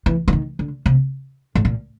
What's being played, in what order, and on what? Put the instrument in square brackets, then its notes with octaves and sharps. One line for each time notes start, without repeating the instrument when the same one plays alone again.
[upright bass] E3
E3
D#3
D3
C3
A2
A#2